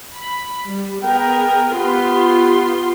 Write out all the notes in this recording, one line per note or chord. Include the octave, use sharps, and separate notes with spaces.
B5
G3
B3 G#4 A#4 G5
B3 F4 G4 C6